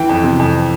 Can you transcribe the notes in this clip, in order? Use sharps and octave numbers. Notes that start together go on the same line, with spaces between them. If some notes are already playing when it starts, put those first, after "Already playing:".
Already playing: E3 G5
F2
C3
F2